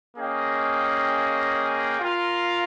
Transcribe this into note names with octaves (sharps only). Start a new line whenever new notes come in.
A#3 C#4 G#4 D#5 G5
F4 A#4 F5